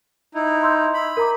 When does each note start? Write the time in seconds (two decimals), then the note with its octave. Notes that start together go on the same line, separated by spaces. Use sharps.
0.34 D#4 E4
0.63 C6 E6 G6
0.94 B5
1.17 A#4 A#5 D6